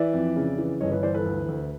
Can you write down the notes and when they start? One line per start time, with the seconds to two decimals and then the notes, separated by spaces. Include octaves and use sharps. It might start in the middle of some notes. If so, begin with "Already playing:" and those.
Already playing: E3 D5 E5
0.13 F2
0.36 C#3
0.58 E3
0.81 G1 C#5 D#5
0.92 B4 C#5
1.03 E3 C5 D5
1.14 A4 B4
1.26 D2
1.49 D2